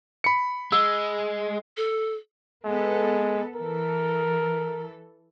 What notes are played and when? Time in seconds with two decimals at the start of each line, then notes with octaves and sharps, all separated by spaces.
0.24 B5 C#7
0.72 G#3 E6
1.77 A4
2.65 G#3 B3 A4
3.55 E3 A4 A#4